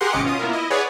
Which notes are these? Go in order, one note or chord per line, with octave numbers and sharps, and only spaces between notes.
G4 G#4 A#4 F#5 C6
G#1 C3 C#4 D#5 D6 C#7
B2 C#4 F4 D#6
A#3 B3 E4 F4 A#4
E4 D#5
G#4 B4 C#5 D5 F#5 G#5